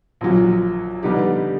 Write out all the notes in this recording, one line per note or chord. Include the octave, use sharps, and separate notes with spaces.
A#1 A#2 F#3
D3 G3 B3 D#4 G4